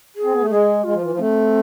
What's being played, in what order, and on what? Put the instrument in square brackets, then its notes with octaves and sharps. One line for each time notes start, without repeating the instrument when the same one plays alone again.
[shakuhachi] G#4
[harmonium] C4
B3
A3
[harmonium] G#3 [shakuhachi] G#4
[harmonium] G#3 [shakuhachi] F4
[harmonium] F3
E3
F3
[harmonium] A3 [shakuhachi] C4